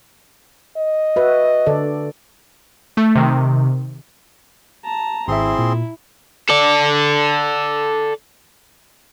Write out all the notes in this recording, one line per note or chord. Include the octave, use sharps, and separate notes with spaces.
D#5
F#4 B4 E5
D3 A4 D5
A3
C3 D#3
A5 A#5
G#1 C4 E4 G#4 E5 C6
A#2
A4 D5